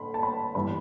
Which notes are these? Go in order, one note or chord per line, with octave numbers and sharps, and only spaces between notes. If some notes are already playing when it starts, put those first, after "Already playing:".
Already playing: D3 B5 C6
A5
B5
G2 E3 B5